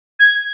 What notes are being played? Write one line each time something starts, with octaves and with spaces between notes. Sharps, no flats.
G#6